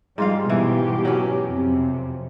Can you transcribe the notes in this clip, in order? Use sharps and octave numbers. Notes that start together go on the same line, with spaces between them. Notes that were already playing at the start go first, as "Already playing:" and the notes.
G#2 G3 F4 F5
B2 E3 G4
F#3 C#4
F2 C3